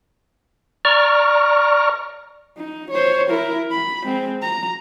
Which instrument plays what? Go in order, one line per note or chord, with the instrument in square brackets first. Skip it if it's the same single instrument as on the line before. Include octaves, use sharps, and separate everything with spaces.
[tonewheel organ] D5 A#5 C#6 F6
[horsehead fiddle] D#4
C5 C#5
E4 A#4
B5
G#3 C4
A#5